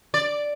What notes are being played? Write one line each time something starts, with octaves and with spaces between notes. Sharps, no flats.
D5